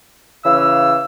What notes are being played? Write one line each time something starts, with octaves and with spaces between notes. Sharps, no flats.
C#3 E3 F5 E6